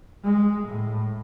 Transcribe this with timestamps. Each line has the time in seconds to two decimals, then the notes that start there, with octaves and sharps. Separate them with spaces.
0.24 G#3
0.67 A2